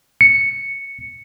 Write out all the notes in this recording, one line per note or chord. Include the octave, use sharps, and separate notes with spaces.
C#7